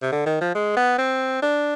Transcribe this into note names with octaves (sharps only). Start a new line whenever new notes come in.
C3
D3
D#3
F3
G#3
B3
C4
D4